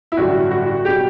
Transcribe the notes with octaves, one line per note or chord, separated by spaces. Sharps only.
E4
A1 G2 D3 F#3 F#4
F#4
B2 F#3 G4